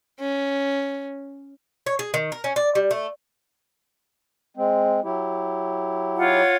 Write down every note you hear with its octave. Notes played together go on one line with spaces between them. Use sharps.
C#4
C#5
G#4
D#3
A#4
C#4
D5
G3
A3
G#3 C4
F#3 E4 G4
F4 C#5 F#5